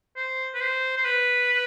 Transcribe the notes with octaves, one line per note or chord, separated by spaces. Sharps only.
C5
B4
C5
C5
B4